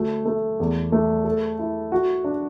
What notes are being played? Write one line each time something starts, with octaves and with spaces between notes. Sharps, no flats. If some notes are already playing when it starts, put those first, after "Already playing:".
Already playing: D2 A3
A3
E2
A3
A4
E4
F#4
D4